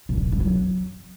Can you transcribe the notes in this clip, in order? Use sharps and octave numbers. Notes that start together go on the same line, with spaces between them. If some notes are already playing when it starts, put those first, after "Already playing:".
A#2
D3
A#2
D3
F#3